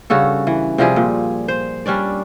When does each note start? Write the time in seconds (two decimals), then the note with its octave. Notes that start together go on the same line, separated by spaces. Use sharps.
0.10 G2 C#3 F#4 A4
0.47 E3
0.78 C3 F3 G3 G#4
0.96 A#2
1.48 C5
1.86 G3 C#4 D4 D5